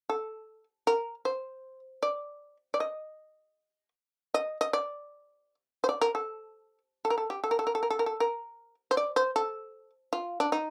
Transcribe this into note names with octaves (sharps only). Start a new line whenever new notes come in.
A4
A#4
C5
D5
D5
D#5
D#5
D#5
D5
C5
D5
A#4
A4
A4
A#4
A4
G4
A4
A#4
A4
A#4
A4
A#4
A4
A#4
A4
A#4
C5
D5
C5
A4
F4
D4
D#4